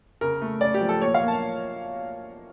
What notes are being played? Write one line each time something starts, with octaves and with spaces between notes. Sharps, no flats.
C#3 A#4
A3
C#3 D5
G4
F3
A4
A#2 C#5
F5
A#3
A5